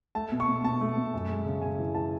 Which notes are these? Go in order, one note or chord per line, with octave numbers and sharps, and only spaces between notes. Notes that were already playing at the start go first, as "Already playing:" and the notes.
A3 A5
B2
C#6
B2
B2 A5
A3
B2
F#2
G#3
C#3
C#3 G#5
E3
E3 A5